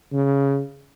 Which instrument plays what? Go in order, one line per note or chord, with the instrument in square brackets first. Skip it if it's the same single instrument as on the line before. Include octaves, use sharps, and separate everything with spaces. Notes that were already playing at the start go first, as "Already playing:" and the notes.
[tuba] C#3